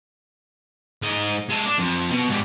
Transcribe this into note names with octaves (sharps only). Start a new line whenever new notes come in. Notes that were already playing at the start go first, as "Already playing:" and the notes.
G#2 D#5
G#3 A4
D4
F2
B2
G#2 G3